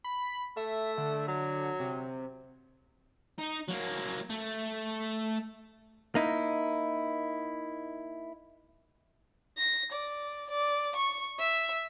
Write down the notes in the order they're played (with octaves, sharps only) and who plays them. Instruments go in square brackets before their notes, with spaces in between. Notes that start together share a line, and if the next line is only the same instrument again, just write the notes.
[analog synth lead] B5
[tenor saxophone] A3 [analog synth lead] E5
[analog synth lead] D3
[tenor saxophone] F#3
[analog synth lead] C3
[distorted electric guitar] D#4
F#3 A#3
A3
[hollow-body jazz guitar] A#3 D#4 E4
[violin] A#6
D5
D5
C#6
E5